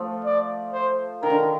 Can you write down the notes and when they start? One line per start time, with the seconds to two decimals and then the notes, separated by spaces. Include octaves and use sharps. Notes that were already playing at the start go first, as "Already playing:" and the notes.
Already playing: F3 A3
0.25 D5
0.73 C5
1.23 D#3 A#4
1.30 D3
1.39 D#3